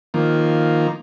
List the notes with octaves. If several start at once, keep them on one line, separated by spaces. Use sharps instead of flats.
D#3 F3 A#3